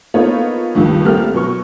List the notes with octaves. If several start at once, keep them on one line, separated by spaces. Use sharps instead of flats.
A#3 B3 D#4 F4 A4 C#5
C#2 G2 D#3 F3
A1 G3 A#3 C4 A4 F6
B2 F#3 C#6